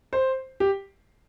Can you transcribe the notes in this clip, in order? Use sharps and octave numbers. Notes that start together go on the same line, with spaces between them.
C5
G4